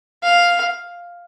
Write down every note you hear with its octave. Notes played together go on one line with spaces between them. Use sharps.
F5